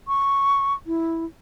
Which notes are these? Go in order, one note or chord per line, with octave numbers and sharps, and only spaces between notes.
C#6
E4